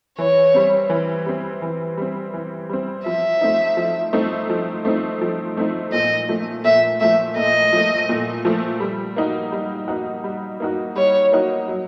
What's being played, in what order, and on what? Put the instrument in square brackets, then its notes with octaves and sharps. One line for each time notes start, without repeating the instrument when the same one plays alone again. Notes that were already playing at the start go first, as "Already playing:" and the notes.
[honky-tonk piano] E3 [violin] C#5
[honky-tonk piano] G3 C4
E3
G3 C4
E3
G3 C4
E3
G3 C4
[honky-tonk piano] F3 [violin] E5
[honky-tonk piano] A3 C4 D#4
F3
A3 C4 D#4
F3
A3 C4 D#4
F3
A3 C4 D#4
[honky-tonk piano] A#2 [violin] D#5
[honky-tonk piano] F3 A3
[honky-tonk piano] A#2 [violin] E5
[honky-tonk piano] F3 A3 [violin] E5
[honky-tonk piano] A#2 [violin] D#5
[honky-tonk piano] F3 A3
A#2
F3 A3
G3
A#3 D#4 F#4
G3
A#3 D#4 F#4
G3
A#3 D#4 F#4
[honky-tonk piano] G3 [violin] C#5
[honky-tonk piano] A#3 D#4 F#4
F#3